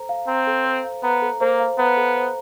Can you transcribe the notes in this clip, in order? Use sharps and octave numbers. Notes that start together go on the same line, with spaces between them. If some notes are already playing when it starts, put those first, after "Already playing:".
Already playing: A4 C5 A#5
F5
C4 A#5
A4
C5
F5
B3 A#5
A4
A#3 C5
F5
B3 A#5
A4
C5